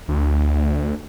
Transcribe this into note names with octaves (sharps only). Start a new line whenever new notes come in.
D2